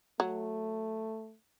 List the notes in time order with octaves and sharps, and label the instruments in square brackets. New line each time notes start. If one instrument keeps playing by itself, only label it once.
[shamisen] F#3 [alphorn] A3